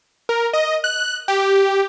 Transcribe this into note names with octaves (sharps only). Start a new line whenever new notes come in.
A#4
D#5
F#6
G4